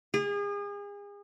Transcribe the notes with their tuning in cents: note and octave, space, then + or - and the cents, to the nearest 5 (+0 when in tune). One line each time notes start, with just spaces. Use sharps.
G#4 -35